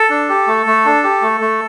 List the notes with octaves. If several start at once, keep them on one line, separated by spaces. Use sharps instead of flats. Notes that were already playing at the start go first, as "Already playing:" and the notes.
Already playing: A4
D4
G4
A3
A3
D4
G4
A3
A3